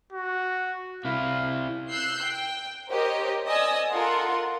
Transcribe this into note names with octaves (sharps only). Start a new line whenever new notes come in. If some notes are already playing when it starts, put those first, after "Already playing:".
F#4
C3 E4 F5
E6 F#6 G6 C7
G5
G4 A#4 C5 C#5 D#5 G5
D5 D#5 G#5 D#6 E6
F4 A4 A#4 F#5 C6